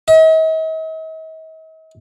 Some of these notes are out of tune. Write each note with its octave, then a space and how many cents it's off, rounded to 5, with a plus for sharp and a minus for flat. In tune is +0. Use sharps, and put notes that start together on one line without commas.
D#5 +45